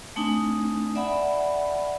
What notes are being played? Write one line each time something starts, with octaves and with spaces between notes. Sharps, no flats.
A3 C4 D4 D#4 G#5 D#6
D5 E5 F#5 G#5 B5